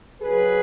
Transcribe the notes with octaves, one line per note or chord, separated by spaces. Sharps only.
C#3 F#3 G#4 B4